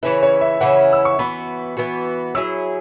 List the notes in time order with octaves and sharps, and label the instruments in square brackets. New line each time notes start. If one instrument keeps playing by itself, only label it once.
[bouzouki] C#3 E3 C#4 E4 [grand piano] B4
[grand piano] C#5
E5
[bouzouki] C#3 E3 C#4 E4 [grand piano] F#5
[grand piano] E6
C#6
[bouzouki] E3 B3 F#4 [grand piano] B5
[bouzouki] E3 B3 F#4
[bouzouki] F#3 E4 G#4 [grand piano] E6